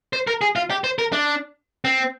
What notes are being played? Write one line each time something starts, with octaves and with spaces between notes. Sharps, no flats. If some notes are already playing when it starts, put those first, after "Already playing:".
C5
A#4
G#4
F4
G4
C5
A#4
D4
C4